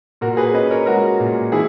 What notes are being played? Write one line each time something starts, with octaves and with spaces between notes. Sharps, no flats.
A#2 F#4 A#4
G#4 B4
C#4 B4 D#5
A#4 C#5
G#3 F#4 A#4
A#2
E3 E4 G#4